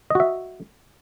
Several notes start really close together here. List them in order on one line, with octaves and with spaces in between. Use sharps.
D#5 F#4 E5